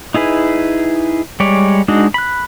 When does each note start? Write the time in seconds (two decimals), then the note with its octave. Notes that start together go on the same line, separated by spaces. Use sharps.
0.14 D#4 E4 G#4 B4
1.40 G3 G#3 C#5 D5
1.88 G#3 D4 D#4 F#4
2.14 B5 F#6